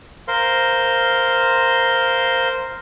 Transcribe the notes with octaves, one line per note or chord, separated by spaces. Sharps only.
A#4 C5 F5 C6